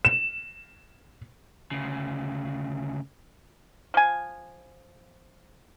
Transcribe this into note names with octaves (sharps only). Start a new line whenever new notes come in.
E7
D2 C#3
F3 G#5